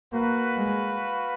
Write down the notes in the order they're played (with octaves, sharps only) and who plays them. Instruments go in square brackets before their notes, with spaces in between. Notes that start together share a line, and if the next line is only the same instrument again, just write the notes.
[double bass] A#3 [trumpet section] F#4 B4 F5
[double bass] G#3